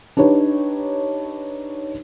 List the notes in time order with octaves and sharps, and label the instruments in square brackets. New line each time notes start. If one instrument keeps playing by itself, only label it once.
[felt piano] D4 D#4 G4 B4 C#5